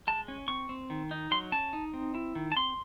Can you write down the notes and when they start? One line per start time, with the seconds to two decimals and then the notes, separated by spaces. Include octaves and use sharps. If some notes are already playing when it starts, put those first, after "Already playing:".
0.07 G#3 A5
0.28 C#4
0.48 C4 C#6
0.69 C4
0.90 D#3
1.11 D#4
1.31 F#3 C6
1.52 C#4 A5
1.73 D#4
1.93 C4
2.15 E4
2.35 D#3
2.52 A5
2.56 C4 C6